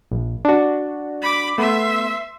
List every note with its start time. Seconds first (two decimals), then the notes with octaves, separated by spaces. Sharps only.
0.11 A#1
0.45 D4 F#4
1.22 B5 D6
1.58 A3 B3 E5 C6